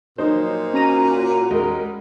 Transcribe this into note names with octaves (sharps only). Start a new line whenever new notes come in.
A#2 F3 F#3 D#4 C5 C#5
C#4 F#4 A#5 D#7
G3 G#3 A#4